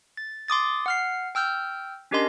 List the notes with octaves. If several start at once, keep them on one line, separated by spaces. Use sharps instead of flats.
A6
C6 D6 D#6 A6
F#5 F6 C7
G5 E6 F6 G6
C#4 D4 G4 A#4 D#5 C6